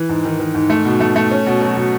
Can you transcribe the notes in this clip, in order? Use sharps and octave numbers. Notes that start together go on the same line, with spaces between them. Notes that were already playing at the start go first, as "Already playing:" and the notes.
Already playing: E3
G#2
D#3
D#3
G#2
A3
B2
A3
A3
C#4
B2
F#3
B2